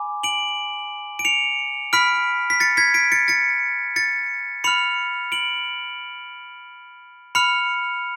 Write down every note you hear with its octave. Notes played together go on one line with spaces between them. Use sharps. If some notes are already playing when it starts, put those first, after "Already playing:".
Already playing: G#5 B5 D6
D7 F#7
D7
C#7 F7
B5 F6 B6 D7
B6
A6 C#7
G#6 B6
B6 D7
A6 C#7
A6 C#7
A6 C#7
B5 F6 C#7 F7
D7 F#7
B5 F6 C#7 F7